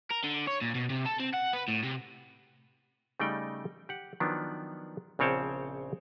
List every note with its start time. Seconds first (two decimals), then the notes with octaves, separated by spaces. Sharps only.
0.11 A#4
0.24 D3
0.48 C#5
0.62 A#2
0.75 B2
0.90 C3
1.05 A4
1.19 C4
1.33 F#5
1.53 B4
1.68 A2
1.83 C3
3.20 C#3 G3 A3 D#4 D5 G5
3.89 G4 F#5
4.20 D#3 F3 F#3 B3 D4
5.19 A#1 C#3 C4 C#5 G5 A5